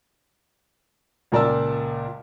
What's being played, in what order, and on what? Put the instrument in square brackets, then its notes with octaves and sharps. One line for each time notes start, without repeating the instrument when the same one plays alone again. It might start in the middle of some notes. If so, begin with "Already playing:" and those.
[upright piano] C#2 A#2 A#4 D5 A5 E6